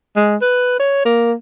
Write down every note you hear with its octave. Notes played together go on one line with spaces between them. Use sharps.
G#3
B4
C#5
A#3